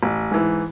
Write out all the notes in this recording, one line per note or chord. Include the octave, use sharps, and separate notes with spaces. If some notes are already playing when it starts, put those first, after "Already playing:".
A1
G#2 E3